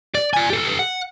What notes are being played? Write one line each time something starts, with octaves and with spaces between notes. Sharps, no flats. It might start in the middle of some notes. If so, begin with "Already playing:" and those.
D5
D5 G#5
G4 A4
F#5